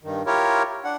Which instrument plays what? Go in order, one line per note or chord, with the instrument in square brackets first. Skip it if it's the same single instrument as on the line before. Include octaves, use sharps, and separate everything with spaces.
[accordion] G2 D#3
E4 F4 G4 A#4 C#5
D4 F#5